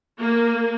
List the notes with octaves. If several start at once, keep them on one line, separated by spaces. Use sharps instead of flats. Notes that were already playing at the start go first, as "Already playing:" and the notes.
A#3